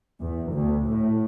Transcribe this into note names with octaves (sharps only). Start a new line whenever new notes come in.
E2
D2
A2